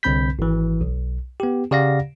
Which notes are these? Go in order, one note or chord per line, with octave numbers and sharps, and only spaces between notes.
C2 D3 C4 B5 G6 B6
G#1 E3
B1
B3 G4
C#3 G4 D5 F5 F#5 A#6